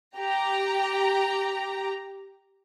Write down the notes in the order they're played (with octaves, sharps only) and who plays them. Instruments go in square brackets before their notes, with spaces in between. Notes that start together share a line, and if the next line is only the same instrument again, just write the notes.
[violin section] G4 A#5